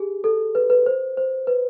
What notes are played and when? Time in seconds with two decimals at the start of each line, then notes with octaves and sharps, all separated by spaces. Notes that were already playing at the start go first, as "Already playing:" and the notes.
Already playing: G4 G#4
0.24 A4
0.55 B4
0.70 B4
0.86 C5
1.17 C5
1.47 B4